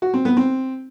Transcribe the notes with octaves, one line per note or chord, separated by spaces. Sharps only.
F#4
C4
B3
C4